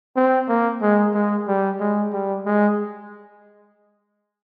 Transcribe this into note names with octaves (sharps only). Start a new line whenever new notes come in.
C4
A#3
G#3
G#3
G3
G#3
G3
G#3